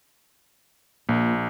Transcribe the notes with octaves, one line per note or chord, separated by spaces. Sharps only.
A#1 A#2